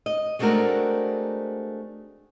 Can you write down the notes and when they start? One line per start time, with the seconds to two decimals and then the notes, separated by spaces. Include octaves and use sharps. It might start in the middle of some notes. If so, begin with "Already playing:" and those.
0.06 D#5
0.39 G#3 A3 C4 D4 F#4 A#4